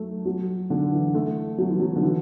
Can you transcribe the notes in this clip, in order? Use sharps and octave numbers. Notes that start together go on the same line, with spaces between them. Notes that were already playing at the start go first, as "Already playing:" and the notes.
Already playing: F#3 A3
F#3
D3
E3
A3
F#3
E3
F#3
D3
E3